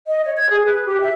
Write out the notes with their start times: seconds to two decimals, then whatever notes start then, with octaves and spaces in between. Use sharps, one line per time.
0.08 D#5
0.25 C#5
0.37 G#6
0.50 G#4
0.66 B4
0.86 G4
1.00 E5